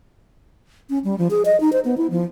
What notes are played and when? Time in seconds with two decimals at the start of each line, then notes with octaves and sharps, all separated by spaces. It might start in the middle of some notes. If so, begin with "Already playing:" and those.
0.90 C#4
1.04 G3
1.18 F3
1.31 G#4
1.45 D#5
1.60 D#4
1.73 C5
1.85 B3
1.97 E4
2.11 F3